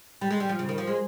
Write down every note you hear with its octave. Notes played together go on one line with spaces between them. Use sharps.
G3
G#3
G3
F3
C#3
D#3
F3
G#3